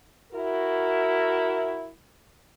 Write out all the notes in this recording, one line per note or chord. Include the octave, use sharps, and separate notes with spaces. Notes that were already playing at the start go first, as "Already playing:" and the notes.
E4 F#4 A#4